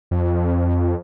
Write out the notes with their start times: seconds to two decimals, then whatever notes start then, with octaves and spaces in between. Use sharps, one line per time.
0.11 F2